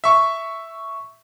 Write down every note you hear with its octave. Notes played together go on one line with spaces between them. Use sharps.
E5 C#6